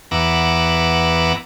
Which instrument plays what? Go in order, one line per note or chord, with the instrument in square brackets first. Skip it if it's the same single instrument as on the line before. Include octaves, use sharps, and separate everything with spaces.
[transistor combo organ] E2 B3 E5 F#5 A#5 D6